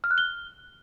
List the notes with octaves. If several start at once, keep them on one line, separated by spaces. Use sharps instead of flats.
F6
F#6
G7